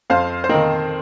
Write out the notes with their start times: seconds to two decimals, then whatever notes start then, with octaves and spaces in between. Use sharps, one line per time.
0.10 F2 C5 F5
0.44 C5
0.49 D#3 C4 A#4 D#5